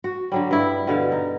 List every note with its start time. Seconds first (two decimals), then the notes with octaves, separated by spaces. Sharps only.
0.04 F#4
0.32 D3 F#3 G3
0.51 G2 E4
0.87 B2 D3 F5
1.12 D#4